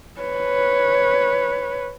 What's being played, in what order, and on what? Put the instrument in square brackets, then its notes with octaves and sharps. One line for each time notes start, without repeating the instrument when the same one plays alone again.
[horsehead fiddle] B4 C#5